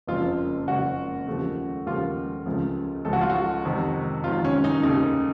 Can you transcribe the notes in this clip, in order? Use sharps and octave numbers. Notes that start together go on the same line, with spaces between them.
F#1 F2 C#3 F3 F4
F#1 F2 C#3 F3 F#4
D#2 C#3 F3 A3
D#2 C#3 F3 A3 F4
C#2 C#3 F3 A3
C#2 C#3 F3 A3 A4
F#4
F4
F#4
F2 C3 D#3
F2 C3 D#3 F4
C#4
D#4
D#2 C#3 A3 D#4